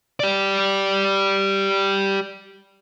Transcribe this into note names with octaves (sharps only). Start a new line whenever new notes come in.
G4 D5